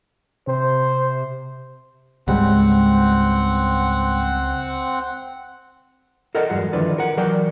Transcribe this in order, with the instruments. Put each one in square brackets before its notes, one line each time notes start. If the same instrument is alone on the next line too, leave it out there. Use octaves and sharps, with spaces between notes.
[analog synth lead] C3 [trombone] C5
[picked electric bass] C#2 [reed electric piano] G#2 G3 G#3 [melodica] C4 F#5
[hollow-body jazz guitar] A4 A#4 D5 D#5 F#5 G5
E2 G2 F#3 G#3 F#5
D3 D#3 F3 E4 B4 D5
A#4 F#5
E3 F#3 A#4 D5 G5